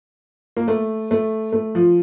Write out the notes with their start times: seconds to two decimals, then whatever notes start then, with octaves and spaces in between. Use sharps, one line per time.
0.57 A#3
0.68 A3
1.11 A3
1.53 A3
1.75 F3